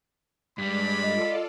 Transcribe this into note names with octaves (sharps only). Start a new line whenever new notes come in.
G2 G3 G#3 D5 B5
F4 A4 D5 D#5